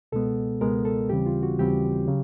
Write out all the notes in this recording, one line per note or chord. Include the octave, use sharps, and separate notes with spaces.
C#2 B2 G#3 B3 A4
C#2 B2 G#3 B3 A#4
A4
D#2 C#3 E3 G3 C4 G4
F4
F#4
D#2 C#3 E3 G3 C4 G4
C#3 F#3